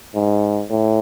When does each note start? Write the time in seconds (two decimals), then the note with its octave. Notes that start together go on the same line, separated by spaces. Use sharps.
0.15 G#2
0.70 A2